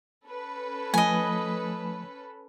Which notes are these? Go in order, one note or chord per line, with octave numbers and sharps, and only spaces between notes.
C#4 A4 B4
F3 A3 D#5 G#5